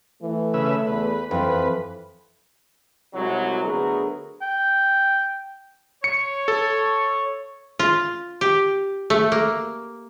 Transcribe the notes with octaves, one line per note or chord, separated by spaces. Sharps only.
E3 A3
C#3 B4 E5
E2 B4
F2 E3 C4 B4
C2 F#3 G#3
D3 F#3 A3 B3 G#4 A#4
G5
C#5 C#7
A4
F4
G4
A3
A#3